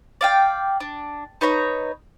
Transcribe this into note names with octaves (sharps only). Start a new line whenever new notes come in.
D5 F5 G5
D4
D#4 B4 C#5 A#5